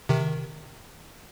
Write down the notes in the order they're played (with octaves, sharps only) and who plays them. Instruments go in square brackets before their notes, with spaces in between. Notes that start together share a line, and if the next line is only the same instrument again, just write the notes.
[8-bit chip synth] C3 D#3